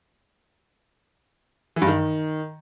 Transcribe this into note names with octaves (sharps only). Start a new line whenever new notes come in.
E3
G2
D#3